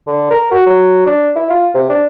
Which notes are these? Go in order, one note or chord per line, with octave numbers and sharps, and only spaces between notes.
D3
A#4
F#4
F#3
D4
E4
F4
C3
D4